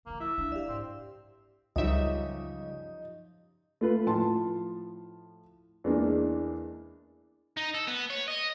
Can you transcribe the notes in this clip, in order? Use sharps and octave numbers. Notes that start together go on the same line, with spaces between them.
D3 F3 A#3
E4 E5 E6
G3 D4
G4 D5 F5 E6
G#2 C4
C#2 F#2 C#3 F3 G3 D#4 D#5 E5
A3 F4 B4
A2 F3 A5 C6
E2 G#3 A#3 D4
D#4
A4
B3
C#5
D#5